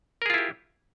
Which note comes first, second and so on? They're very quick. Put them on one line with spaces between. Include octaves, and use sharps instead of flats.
A#4 G#4 F4 E4 G4